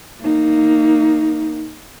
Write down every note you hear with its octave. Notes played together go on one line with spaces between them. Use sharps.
A#3 D#4